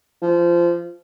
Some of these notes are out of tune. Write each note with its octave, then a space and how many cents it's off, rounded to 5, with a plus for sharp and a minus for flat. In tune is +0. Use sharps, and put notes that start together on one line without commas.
F3 -20